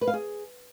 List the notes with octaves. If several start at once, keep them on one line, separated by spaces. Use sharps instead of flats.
B4
F5
G#4